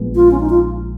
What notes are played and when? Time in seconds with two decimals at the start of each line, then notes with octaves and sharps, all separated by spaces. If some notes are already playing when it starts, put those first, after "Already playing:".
Already playing: A#1 A#2 G#3 B3
0.15 F4
0.31 C#4
0.40 D#4
0.50 F4